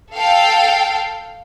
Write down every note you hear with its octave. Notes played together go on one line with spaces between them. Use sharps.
A4 F5 G5